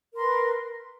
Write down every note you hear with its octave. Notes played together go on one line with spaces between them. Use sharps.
A#4 B4 C6